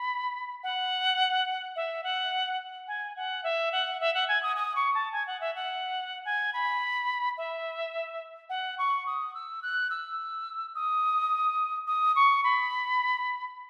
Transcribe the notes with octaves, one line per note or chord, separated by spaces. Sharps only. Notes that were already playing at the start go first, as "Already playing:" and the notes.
Already playing: B5
F#5
E5
F#5
G#5
F#5
E5
F#5
E5
F#5
G#5
D#6
D#6
C#6
A5
G#5
F#5
E5
F#5
G#5
B5
E5
F#5
C#6
D#6
E6
F#6
E6
D#6
D#6
C#6
B5